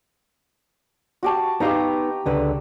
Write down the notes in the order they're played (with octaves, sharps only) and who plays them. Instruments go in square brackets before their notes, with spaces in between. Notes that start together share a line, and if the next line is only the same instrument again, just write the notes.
[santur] F#4 G4 A5
[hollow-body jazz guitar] B3 D#4 F5 [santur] G4 G5 A#5
[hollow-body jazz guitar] C#2 D3 B4